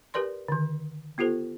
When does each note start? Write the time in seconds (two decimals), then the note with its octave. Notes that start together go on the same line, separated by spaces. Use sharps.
0.14 G4 A#4 B4 D5 C6
0.48 D3 D#3
1.18 B3 F4 G4 A4 C5